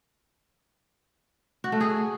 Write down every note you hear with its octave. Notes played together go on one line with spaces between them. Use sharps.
F#4
A3
G#4